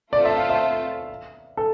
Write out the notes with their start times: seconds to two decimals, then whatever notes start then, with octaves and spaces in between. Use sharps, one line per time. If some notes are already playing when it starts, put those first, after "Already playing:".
0.13 A3 C4 F4 A4 C5 D5
0.25 E5
0.37 F5
0.49 E5
1.57 A4